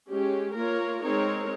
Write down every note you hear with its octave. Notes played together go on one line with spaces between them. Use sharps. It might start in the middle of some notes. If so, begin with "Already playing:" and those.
G#3 C#4 G4
A#3 F4 A#4 C#5
G#3 C4 D#4 A#4 C#5